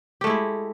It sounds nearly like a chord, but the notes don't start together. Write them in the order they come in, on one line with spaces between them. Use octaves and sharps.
G4 A3 G#3 E4